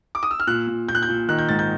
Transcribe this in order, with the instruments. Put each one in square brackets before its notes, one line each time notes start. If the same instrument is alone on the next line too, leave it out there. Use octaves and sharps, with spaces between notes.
[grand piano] D6
D#6
E6
F6
A#2 F#6
A#2
A#2 G6
F#6
G6
A#2
D#3 F#6
G6
G#2 A6
G6